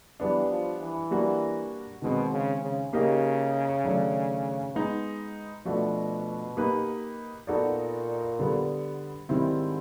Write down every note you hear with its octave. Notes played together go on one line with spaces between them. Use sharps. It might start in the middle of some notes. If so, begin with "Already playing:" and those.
E3 G3 B3 D4
F3
E3
G3 A#3 D4 F#4
B2 D#3 G#3 C4
C#3
C#3
C#3 A#3 D#4 G4 A#4 D#5
D#3 F#3 A3 D4
G#3 B3 D#4
B2 F3 A3 D4 F#4 B4
A#3 D#4 G4 B4
A#2 B3 D#4 F#4 A4 D5
D3 G3 B3
G#2 D#3 G3 C4 E4